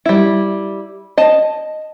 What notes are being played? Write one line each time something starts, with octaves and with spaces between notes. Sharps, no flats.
G3 E4
D#5 A5